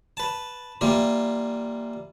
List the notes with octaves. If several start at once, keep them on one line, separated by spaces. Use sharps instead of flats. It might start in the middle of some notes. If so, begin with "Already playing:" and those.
B4 A5
E3 G3 A#3 F4